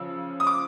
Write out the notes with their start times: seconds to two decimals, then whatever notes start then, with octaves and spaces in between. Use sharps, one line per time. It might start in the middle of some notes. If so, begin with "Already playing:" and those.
Already playing: C#3 F3 E6
0.40 D#6
0.47 D6